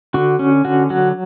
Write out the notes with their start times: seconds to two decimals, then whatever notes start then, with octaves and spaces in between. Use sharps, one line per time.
0.14 D3 F#4
0.39 C#4
0.65 D3 F#4
0.90 F#3 F#4